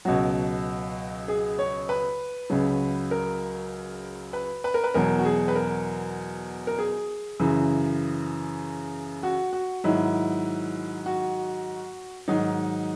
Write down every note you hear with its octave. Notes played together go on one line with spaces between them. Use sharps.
C#2 B2 F#3 F#4
G#4
C#5
B4
C#2 C#3 F#3
A#4
B4
B4
A#4
B4
E2 B2 F#3 A#4
F#4
G#4
B4
A#4
A#4
G#4
F#2 C#3 E3
F#4
F#4
G#2 D#3 F#3 E4
F#4
G#2 D#3 F#3 D#4